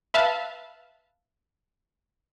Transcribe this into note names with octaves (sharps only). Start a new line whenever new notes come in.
B4 E5 F5 A5